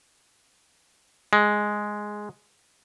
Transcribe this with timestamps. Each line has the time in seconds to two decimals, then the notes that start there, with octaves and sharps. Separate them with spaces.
1.33 G#3